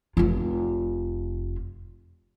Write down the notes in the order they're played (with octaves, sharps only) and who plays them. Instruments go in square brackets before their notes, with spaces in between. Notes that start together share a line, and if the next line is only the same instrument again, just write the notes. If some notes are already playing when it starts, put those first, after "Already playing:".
[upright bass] F1 F4